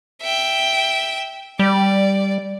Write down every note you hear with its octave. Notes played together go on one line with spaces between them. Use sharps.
E5 G5
G3 D5